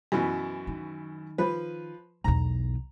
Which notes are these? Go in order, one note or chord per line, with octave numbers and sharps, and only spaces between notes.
F#2 B2 E3
D#3
F3 B4
B1 E2 A#5